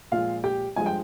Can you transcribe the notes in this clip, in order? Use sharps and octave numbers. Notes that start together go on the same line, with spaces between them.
A#2 F3 G#3 F4 F5
G4 G5
G2 F3 G#3 G#5
G5